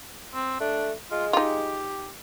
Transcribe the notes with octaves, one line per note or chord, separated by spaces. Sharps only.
C4
A3 D4
G#3 F4
D#4 F4 G4